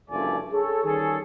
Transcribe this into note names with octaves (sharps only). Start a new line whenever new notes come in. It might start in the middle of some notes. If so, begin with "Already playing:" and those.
F#1 G2 F3 A3 D5 G#5
G#4 A4 C#5
D#3 G3 C#4 G#4 A4